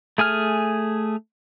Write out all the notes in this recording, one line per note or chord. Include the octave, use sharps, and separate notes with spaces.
A3 G#4 G#5 F6